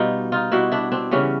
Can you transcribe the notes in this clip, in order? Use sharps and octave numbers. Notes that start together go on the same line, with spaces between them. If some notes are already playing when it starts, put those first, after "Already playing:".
Already playing: B2 G3 D#4 F4
D#4 F4
B2 G3 E4 F#4
D4 E4
C4 D4
C#3 E3 G3 B3 C#4